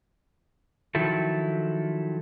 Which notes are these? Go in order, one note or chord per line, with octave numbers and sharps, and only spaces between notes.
D#3 F3 F#3 E4 A4